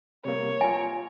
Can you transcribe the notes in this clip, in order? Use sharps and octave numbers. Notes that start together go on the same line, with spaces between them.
C3 G3 A#3 C#5
F4 G#5 A#5